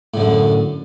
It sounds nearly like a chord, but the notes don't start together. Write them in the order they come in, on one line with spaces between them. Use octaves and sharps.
A2 D3 F#2